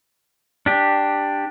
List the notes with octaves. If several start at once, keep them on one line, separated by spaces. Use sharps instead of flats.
D4 G4